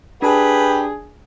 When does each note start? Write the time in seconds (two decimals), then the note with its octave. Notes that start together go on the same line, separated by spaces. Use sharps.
0.22 D4 G4 G#4 B4 A5